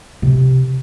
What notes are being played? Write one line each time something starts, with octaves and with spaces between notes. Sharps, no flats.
C3